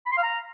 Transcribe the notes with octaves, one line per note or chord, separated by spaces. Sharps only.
B5
C6
F5
A#5